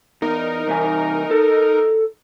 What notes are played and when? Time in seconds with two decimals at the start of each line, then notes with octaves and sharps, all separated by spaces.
0.22 E2 D#4 A#4
0.67 C2 E3 G#5
1.31 A4